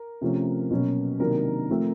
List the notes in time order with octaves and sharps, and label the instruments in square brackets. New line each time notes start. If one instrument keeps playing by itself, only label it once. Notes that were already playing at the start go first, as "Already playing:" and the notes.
Already playing: [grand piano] A#4
C3 F3 A3 C#4
B2 F#3 A#3 C#4
C3 D#3 F#3 A#3 D4 A#4
F3 A3 C4